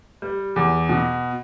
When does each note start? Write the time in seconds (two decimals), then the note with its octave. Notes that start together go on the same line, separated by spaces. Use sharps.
0.22 G3
0.56 E2
0.89 B2